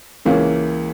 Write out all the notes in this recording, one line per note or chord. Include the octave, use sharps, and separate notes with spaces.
C#2 C#3 E3 A#3 C#4